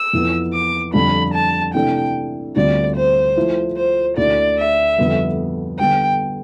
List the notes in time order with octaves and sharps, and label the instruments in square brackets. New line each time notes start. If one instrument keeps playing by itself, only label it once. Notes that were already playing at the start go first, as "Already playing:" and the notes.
Already playing: [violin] E6
[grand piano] F2 E3 B3
[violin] D6
[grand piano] F2 D3 G3 D4 F4 [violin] B5
[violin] A5
[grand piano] C3 E3 A3 D4 A4 [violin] G5
[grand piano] D2 D3 G3 C4 F4 [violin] D5
[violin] C5
[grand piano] F3 A3 E4
[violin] C5
[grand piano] D2 D3 A3 E4 [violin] D5
[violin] E5
[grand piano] F2 D3 G3 B3
[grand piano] D3 G3 B3 [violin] G5